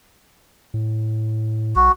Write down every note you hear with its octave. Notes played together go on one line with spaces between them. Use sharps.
A2
B1 F#4